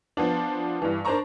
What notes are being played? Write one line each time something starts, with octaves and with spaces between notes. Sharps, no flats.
F3 B3 D4
G2 E3
D4 A#4 C5 A5 A#5 C#6